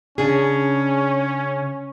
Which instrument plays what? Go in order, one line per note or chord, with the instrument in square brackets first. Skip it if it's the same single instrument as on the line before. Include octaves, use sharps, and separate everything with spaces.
[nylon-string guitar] C#3 D4 G#4 [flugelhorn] C#4